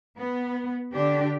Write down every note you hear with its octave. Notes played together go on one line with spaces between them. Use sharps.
B3
D3 D4 G4